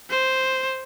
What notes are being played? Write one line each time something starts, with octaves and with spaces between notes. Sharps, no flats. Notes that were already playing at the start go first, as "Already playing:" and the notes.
C5